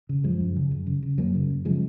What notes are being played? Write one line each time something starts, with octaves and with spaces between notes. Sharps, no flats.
C#3
F#2 F3 G#3
F#2
C#3
F#2
C#3
C#3
F#2 F#3 A#3
C#3
F#2
C#3 F3 G#3